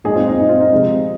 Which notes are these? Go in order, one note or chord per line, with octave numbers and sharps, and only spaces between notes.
A#2 G#3 D#4 G#4
C4 F4
D#4
D#4
C4 F4
D#4
C3 F3 G#3